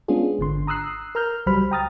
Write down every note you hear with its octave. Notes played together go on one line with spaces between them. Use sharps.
G#3 B3 C#4 D4 F4 G#4
G#1 D3 C6
A#5 D#6 E6 F#6 C7
A#4 A#5 F6 G6
C#2 F#3 G3 C5 B5 F6
G5 A#5 D#6 F6 A6